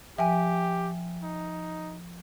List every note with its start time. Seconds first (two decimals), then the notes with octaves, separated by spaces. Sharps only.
0.18 F3 G4 E5 G5 G#5
1.23 D#4